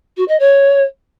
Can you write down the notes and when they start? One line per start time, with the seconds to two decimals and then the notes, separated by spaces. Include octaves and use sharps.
0.17 F#4
0.28 D#5
0.39 C#5